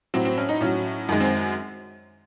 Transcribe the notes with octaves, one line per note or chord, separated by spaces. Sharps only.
A2 F#3 C4
C4
C#4
D#4
A2 F#3 C#4
F#2 D#3 G#3
C4